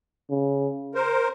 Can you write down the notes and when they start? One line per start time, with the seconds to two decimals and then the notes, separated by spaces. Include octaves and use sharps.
0.30 C#3
0.94 A#4 C5